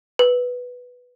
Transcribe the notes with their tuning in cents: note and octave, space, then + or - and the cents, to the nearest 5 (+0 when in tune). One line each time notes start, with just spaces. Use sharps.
B4 +0